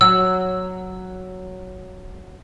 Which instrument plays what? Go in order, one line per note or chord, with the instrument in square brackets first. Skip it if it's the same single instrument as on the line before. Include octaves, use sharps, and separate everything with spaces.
[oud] F#3 [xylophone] E6